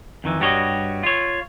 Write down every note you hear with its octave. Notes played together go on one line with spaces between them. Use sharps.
F2 D#3 E3
G2 G3 F#4 C#5 D#5
F4 C#5